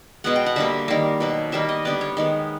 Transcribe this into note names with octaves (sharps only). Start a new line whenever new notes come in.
B2 G#3 B3 F#5
G5
F#5
D3 G3 A#3 E5
D#3 G3 A#3
B2 F#3 A#3
D#3 G3 A#3 E5
D#5
D3 G3 B3 D5
C#5
D#3 G#3 B3